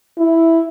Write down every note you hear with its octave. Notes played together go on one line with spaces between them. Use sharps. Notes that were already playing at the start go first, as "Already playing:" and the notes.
E4